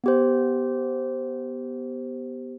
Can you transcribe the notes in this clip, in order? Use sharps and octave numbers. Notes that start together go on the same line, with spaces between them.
B3 G4 C5